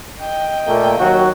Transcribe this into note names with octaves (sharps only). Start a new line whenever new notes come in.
D#5 G5
A#2 A3 A#3
D#2 F#3 F#4